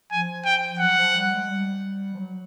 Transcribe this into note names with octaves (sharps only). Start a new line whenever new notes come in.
F3 G#5
G5
F#3 F#5
F3
G3
G#3
G3
F3
F#3